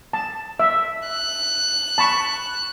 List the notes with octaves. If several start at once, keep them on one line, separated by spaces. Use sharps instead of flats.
A5
E5
F#6
A5 B5 C#6